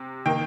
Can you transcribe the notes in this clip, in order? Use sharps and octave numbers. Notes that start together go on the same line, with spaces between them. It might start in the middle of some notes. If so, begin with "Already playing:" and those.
Already playing: C3
D#3 A#3 G5